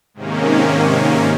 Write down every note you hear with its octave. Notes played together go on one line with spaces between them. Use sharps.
G#2 C3 D#3 A#3 C#4